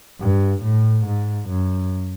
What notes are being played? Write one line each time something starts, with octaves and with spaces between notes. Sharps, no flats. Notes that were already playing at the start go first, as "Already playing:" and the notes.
G2
A2
G#2
F#2